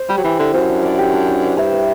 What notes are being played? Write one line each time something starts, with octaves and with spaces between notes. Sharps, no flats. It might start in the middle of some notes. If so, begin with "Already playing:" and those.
Already playing: C5
G3 G4
F#3
E3 E4
D3 E4
F#2 C5
D4
D5
G4
D4
D4
D5
G2 E5
B4